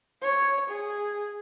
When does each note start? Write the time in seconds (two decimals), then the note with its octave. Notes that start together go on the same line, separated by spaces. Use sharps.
0.22 C#5
0.70 G#4